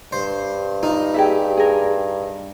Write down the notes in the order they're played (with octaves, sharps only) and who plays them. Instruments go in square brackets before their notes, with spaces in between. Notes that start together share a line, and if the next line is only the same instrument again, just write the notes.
[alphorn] G2 [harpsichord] C5
[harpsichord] D#4 [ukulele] F4
[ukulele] G4 G#4 E5
G#4 A#4